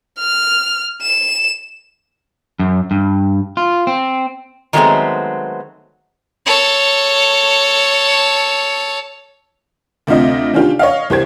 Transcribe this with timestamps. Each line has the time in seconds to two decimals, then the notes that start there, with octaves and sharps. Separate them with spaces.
0.20 F6
1.02 E7
2.59 F#2
2.91 G2
3.57 F4
3.87 C4
4.73 D#3 F#3 G#3 A3 B3 C4
6.46 A4 C#5
10.07 D2 C3 C4 F4 D#5
10.53 D#3 C#4 D4 F4 G4
10.79 C#5 D#5 F5
11.10 C2 G4 C5 G#6